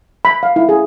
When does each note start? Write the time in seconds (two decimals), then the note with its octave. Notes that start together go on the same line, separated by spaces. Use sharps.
0.25 B5
0.43 F5
0.56 E4
0.69 G#4